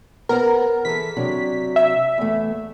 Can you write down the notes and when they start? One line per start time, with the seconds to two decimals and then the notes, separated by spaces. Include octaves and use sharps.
0.29 B3 A#4 C5
0.85 E3 G#4 A4 B6
1.17 C3 F#3 D4
1.76 E5
2.18 E2 A3